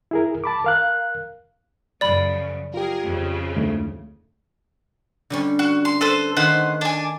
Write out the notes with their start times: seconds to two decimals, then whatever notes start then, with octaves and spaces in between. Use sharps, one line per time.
0.11 E4 G#4 A#4
0.44 A5 B5 D6
0.64 A#4 F5 F#6
2.01 F#2 C#3 F3 D5 B5
2.74 F4 G4 G#4 A#4
3.03 F2 C#3
3.56 D2 G#2 A3
5.30 D3 G3 C#4
5.59 F#4
5.85 C6
6.01 A4 B4 C5
6.37 D#3 A3 B4 C5 F#5
6.81 D4 G#5